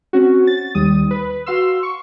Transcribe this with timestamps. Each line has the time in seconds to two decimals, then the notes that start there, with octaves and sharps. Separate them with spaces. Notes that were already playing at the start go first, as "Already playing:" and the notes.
0.13 C4 C#4 F#4
0.47 A6
0.75 D#2 G3 D#6
1.11 B4
1.46 F#4 F5 C6 E6
1.83 C#6